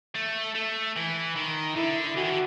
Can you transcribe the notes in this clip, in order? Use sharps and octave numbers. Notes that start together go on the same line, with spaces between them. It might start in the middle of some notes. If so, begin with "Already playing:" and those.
A3
A3
E3
D#3
D3 E4
E3 F#4
D#3
D3